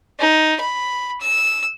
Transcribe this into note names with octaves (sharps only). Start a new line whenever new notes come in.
D#4
B5
E6